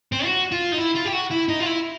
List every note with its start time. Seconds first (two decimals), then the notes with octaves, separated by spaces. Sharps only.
0.12 C4
0.25 F#4
0.52 F4
0.72 D#4
0.78 E4
0.95 F4
1.05 G4
1.13 F#4
1.31 E4
1.49 D#4
1.60 F4
1.66 E4